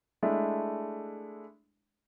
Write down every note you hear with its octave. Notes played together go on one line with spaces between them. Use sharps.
G#3 A3 D4 E4